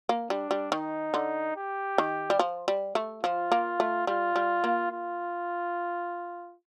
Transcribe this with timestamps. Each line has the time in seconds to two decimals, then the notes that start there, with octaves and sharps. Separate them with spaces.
0.09 A#3
0.30 G3 D4
0.51 G3
0.72 D#3 D#4
1.14 D3
1.57 G4
1.98 D#3
2.30 G3
2.39 F3
2.68 G3
2.95 A3
3.23 F3 F4
3.52 A#3
3.80 A3
4.07 G3 F4
4.36 G3
4.64 A#3
4.91 F4